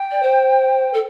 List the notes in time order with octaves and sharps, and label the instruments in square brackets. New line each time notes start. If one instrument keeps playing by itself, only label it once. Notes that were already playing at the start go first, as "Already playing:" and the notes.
Already playing: [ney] G5
[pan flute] D5
C5
A4